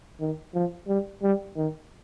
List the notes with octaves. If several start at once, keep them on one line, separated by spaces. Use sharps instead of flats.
D#3
F3
G3
G3
D#3